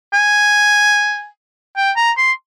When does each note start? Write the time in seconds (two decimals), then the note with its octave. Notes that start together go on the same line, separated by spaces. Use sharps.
0.13 G#5
1.76 G5
1.96 A#5
2.17 C6